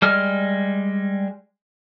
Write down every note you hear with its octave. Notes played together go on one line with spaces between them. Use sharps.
G3 G#3 F6